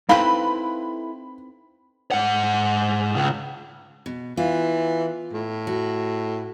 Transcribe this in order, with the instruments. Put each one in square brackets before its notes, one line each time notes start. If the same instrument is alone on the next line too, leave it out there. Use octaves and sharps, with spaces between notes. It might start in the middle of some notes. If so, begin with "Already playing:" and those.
[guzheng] C4 B4 [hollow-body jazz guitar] D#4 E4 A4 [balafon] F5 [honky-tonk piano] B5
[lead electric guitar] G#2 F#5
C#2
[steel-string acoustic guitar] B2
[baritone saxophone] E3 [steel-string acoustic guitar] F4
[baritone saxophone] A2
[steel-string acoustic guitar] F#4